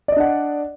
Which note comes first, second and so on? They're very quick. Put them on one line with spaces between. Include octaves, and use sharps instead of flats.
D5 D#5 D4 F#5